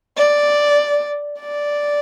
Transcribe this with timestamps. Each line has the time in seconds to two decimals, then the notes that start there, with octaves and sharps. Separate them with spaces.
0.17 D5
1.40 D5